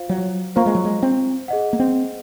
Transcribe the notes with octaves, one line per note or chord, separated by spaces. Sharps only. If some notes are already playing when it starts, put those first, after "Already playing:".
Already playing: F4 C5 F5
F#3
A#3 F4 C5 F5 A#5 C#6
G#3
F#3
G#3
C4
G#4 D#5 F#5
A#3
C4